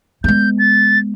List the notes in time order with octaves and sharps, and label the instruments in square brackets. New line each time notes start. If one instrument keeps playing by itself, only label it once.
[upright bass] G#3 B3 [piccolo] G6
[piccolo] A6